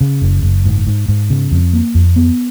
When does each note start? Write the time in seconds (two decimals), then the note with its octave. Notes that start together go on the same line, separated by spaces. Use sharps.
0.01 C#3
0.22 F#1
0.43 F#1
0.65 G#2
0.87 G#2
1.08 G#2
1.30 C#3
1.52 F2
1.73 A#3
1.95 F2
2.16 B3